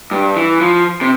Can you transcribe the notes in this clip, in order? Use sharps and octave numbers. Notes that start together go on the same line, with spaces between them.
G2
E3
F3
C3